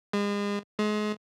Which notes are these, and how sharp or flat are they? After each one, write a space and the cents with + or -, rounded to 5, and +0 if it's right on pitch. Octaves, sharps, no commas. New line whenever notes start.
G#3 -35
G#3 +30